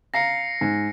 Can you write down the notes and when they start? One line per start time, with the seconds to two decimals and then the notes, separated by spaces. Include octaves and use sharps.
0.14 F5 A#5 A#6 C7 C#7
0.61 G#2